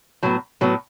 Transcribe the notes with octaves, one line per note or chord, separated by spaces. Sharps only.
A2 F#3 B3
A2 F#3 B3